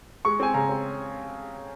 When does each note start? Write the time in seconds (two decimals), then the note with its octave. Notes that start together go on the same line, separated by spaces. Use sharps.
0.25 G#3 C#6
0.40 C4 G#5
0.54 C#3 A#5
0.69 C4